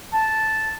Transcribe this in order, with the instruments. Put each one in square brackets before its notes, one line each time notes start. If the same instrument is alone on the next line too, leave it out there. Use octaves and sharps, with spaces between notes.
[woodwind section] A5